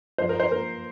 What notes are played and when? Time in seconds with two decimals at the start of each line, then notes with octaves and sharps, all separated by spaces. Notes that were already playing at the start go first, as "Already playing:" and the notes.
0.18 F3 C5
0.29 A#4
0.40 C5
0.52 A#3 A#4